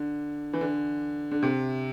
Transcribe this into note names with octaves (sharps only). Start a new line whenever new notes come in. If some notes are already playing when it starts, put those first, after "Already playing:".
Already playing: D3
E3
D3
D3
C3